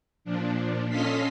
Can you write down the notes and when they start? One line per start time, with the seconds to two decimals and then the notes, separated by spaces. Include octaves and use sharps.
0.25 A#2 F3 D4
0.89 C#4 A4 D#5 F5 C6 B6